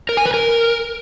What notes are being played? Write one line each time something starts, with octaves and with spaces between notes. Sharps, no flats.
A#4
G#5
B4
A#4